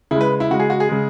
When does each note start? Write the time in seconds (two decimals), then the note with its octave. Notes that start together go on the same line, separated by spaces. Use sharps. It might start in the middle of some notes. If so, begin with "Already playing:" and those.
0.11 C#3 G#3 E4
0.21 B4
0.40 E4
0.51 C#3 G#3 F#4
0.60 G#4
0.70 F#4
0.80 G#4
0.89 C#3 G#3